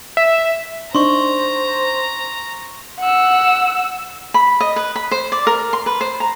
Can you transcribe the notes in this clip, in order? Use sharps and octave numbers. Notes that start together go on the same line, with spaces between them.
E5
D4 D#4 C5 A#5 C6 C#6
F#5 E6
B5
D#5
B4
B5
C5
D5
A#4
C6
B4
C5
A#5